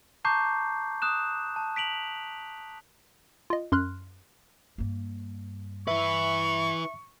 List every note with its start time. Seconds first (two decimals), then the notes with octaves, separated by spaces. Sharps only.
0.25 A5 A#5 C#6 D6 G6 C7
1.02 D#6 F#6 E7
1.56 A5
1.76 B6 D7 F7 F#7
3.50 F4 D#5
3.72 F#2 C6 F6 F#6
4.78 G2 A#3
5.88 E4 B4 E5 C#6